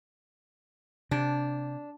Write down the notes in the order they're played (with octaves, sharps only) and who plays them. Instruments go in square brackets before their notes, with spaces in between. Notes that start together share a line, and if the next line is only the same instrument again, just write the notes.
[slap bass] C3 [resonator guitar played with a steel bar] D4